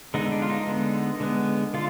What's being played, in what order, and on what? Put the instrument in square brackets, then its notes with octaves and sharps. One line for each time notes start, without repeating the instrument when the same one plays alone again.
[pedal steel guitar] D3 G#3 B3 D#4
D4
F4
D#4
D3 G#3 B3
D3 G#3 B3
D3 F4